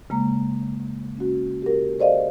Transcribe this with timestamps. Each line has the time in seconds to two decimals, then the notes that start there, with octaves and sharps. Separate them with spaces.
0.10 C#3 G#3 A#3 A#5
1.17 C#4 F#4
1.62 G4 A#4
1.99 A4 C5 D5 D#5 F5